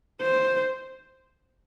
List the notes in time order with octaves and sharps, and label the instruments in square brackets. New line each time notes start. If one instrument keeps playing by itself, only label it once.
[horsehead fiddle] C5